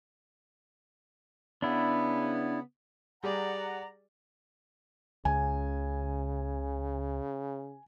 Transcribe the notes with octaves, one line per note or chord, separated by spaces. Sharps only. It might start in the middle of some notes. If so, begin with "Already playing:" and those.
C#3 B3 D4 E4
G3 G4 G#4 D5 F#5 A#5
C#2 C#3 G#5